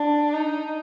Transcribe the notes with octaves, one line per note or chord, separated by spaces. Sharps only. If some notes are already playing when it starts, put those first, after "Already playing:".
Already playing: D4
D#4